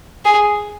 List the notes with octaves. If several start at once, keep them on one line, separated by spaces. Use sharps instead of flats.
G#4